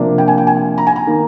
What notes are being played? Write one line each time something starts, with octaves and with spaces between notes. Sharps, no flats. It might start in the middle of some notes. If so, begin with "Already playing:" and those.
Already playing: C3 F3 A#3 D4
G5
G#5
G5
G#5
A#5
G#5
A#5
D#3 A#3 D#4